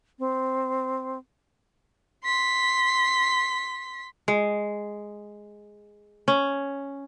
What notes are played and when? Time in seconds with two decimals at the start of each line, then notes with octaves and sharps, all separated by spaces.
0.19 C4
2.24 C6 B6
4.28 G#3
6.28 C#4